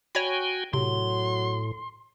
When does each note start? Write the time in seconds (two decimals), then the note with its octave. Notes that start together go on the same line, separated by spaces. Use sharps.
0.15 F#4 C#5 G5 G#5 B5
0.73 A2 C3 F#3 C6